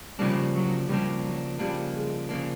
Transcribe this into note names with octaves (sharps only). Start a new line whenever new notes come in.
C#3 F3 G3 A#3 D4
F#3
C#3 F3 G3 A#3 D4
F#3
C#3 F3 G3 A#3 D4
G#3
C#3 F3 A#3 D4